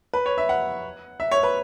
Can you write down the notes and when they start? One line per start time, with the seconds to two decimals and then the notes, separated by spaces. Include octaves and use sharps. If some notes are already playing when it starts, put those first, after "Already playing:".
0.14 B4
0.26 C#5
0.38 E5
0.49 F#5
1.20 E5
1.31 C#5
1.43 B4